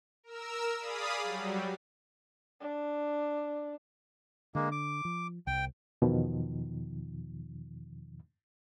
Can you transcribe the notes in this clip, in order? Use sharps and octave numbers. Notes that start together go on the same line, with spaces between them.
A#4 E6
G#4 D5 F5 B5 D#6
F#3 G3
D4
D3 G#3 A#3
D6
F3
C2 G5
E2 B2 D#3 F3